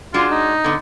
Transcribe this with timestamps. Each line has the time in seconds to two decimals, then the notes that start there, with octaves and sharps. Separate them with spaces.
0.14 G#3 D4 F4 F#4
0.31 D#4
0.64 D3 B3